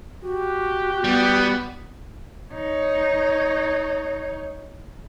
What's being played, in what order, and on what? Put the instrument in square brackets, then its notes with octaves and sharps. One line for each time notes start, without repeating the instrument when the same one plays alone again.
[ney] F#4 [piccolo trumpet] G4
[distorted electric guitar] G3 [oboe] B3
[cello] D#4 C#5